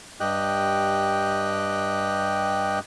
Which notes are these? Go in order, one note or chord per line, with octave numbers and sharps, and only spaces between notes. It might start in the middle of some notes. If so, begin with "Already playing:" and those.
G2 G4 D#5 G5 F#6